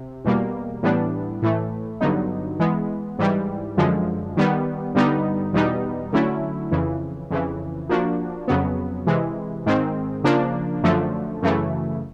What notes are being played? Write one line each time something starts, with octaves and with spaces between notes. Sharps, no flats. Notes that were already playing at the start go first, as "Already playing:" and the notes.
Already playing: C3
E2 B2 G3 A#3
A2 E3 G3 B3 D4
A2 E3 A3
G2 D3 F#3 B3 D#4
E3 G#3 B3
G#2 E3 G3
F#2 D3 F3 G#3
D#3 G3 B3
G2 D3 G3 B3 D#4
E2 B2 G3 B3 D#4
D3 F#3 A3 C#4 E4
F2 C#3 E3
F2 C#3 E3
F3 A#3 D4 F#4
F2 C#3 F#3 B3
C3 E3 G#3
G#2 D#3 G#3 C4
C#3 F3 A#3 D4
F#2 D3 F3 A3
F#2 C#3 E3 A3